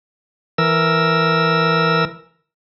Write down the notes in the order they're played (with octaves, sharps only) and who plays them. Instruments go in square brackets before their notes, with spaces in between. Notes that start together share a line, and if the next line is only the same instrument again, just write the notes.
[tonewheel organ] E3 A#4 E6